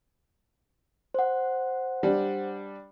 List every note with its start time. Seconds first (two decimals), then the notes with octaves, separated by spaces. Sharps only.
1.14 C5 F#5
2.03 G3 D4